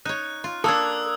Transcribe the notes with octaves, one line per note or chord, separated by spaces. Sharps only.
D#4 C#5 F#6
F4
A#3 D4 A4 D#6 E6 G#6